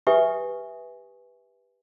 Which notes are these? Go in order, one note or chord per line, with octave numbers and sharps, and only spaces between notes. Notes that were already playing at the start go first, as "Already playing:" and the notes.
G4 B4 E5 G#5 C#6 D#6